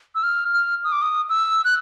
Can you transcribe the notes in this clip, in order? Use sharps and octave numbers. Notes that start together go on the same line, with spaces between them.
E6
F6
F6
D#6
D6
D#6
E6
F#6